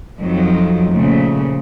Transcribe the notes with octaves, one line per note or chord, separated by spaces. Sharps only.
F2 D#3 F3 F#3
A#2 C#3 F3 A3